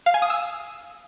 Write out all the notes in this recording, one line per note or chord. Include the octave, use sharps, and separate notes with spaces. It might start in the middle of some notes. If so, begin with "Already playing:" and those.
F5
G#5
D#6
E6